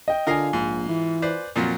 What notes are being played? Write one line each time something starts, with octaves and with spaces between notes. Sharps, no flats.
D#5 G5
D3 F4 A#4 D#5 F5 G#5
A#1 G#2
E3
B4 C5 D5
F2 A#2 F3 F#3